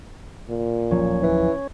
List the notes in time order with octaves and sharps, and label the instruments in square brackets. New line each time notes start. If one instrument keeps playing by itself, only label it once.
[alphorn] A#2
[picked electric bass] D1 F3 F#3 [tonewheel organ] C#4 C#5
[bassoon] E3